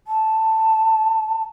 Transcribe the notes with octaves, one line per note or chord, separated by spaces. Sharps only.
A5